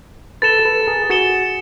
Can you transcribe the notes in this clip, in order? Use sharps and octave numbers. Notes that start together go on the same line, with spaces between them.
A4 B4 A6 C#7 E7 G7
A4 B4
G#4 A#4
F#4 G#4 A6 C#7 E7 G7